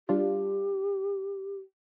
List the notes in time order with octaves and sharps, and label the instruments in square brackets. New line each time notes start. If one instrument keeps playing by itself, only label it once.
[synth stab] G3 D4 F4 [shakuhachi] G4